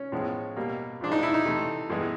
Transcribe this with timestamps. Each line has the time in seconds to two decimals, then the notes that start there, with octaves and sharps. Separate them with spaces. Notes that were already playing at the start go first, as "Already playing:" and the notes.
Already playing: C#4
0.12 A2 F3 G#3 B3
0.57 B2 G3 A#3
1.01 A#2 F3 G#3 D4
1.12 D#4
1.23 E4
1.34 D#4
1.45 C3 E3 A3
1.89 G2 E3 G#3 B3